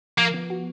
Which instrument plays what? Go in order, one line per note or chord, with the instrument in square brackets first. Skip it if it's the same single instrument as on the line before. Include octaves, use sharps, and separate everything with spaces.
[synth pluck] F3 [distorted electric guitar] A#3
[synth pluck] B3
F#4